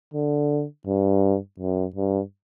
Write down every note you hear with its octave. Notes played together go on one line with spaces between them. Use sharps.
D3
G2
F#2
G2